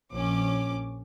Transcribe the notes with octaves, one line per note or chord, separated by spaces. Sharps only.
A#1 C#4 D6